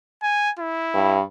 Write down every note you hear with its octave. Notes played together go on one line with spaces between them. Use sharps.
G#5
E4
G2